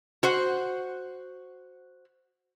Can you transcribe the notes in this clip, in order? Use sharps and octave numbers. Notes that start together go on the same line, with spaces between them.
F#4 C5 F#5